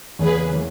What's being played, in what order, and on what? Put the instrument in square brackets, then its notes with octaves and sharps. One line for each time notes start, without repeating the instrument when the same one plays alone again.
[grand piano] E2 C#3 E3 A#3 [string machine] G#4 B4
[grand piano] C#3 E3 A#3